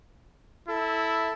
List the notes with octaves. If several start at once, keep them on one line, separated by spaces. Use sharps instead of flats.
E4 A4